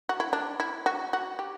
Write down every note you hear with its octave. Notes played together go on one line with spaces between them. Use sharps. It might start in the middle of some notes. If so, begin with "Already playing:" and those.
F#4
E4
D4
E4
F#4
F#4
G4